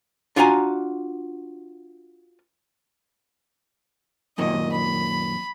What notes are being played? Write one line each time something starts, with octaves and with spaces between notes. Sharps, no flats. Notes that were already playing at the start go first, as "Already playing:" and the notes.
D4 F4 F#4 F5 G#5 A#5
F#2 A#2 D#3 D#5
B5